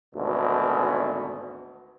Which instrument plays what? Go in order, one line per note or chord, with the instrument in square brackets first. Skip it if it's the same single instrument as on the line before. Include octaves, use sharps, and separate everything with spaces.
[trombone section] G#1 D2 B2